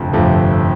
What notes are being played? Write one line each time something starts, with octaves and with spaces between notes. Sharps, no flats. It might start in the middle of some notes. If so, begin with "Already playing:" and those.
Already playing: G1 F2 C3 F3 A3
G1 F2 C3 F3 A3